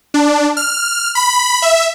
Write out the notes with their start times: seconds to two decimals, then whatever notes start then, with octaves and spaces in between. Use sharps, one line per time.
0.14 D4
0.57 F6
1.15 B5
1.62 E5